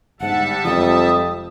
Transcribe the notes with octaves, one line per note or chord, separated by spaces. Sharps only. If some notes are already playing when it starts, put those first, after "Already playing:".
G1 G#2 G3 E5 F#5 A5
F1 F2 F3 G#3 D#6